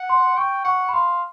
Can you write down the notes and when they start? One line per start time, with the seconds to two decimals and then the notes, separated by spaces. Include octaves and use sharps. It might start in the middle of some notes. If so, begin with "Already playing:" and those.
Already playing: F#5
0.10 C6
0.37 G5 C#6
0.64 F#5 C#6
0.89 B5
0.93 F5 C6